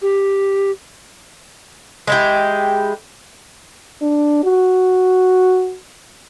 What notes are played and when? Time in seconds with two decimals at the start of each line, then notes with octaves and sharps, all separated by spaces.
0.02 G4
2.07 G#3 E4 G4
4.02 D4
4.44 F#4